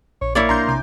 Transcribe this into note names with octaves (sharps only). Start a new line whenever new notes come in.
A#1 C#5
A#3 E4 C#5 D5
B1 D4 A#5 C6 G6
C3 G#5 D6